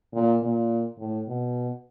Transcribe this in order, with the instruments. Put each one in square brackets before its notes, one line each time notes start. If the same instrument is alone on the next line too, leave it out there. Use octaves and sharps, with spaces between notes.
[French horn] A#2
A#2
A2
B2